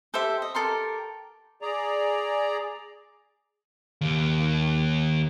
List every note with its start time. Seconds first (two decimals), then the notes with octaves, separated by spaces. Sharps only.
0.14 G4 A4 C5 E5
0.42 D#5
0.55 G4 A4 A#4 C6
1.62 G#4 D5 A#5
4.01 D#2